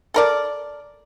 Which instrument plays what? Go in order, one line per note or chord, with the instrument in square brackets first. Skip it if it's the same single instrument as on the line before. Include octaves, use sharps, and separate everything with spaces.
[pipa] A4 A#4 D5